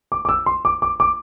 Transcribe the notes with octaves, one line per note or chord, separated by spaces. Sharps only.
D6
D6
E6
C6
D6
D6
D6